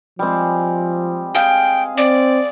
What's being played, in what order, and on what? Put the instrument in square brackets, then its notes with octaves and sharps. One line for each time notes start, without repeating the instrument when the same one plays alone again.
[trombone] F3 [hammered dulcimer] G3 G#3 C4
[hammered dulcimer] G#4 F5 [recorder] G5
[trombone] C4 [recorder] D5